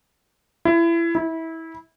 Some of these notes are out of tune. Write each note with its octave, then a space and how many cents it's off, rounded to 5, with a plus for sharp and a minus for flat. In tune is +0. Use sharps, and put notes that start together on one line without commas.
E4 +25
E4 -25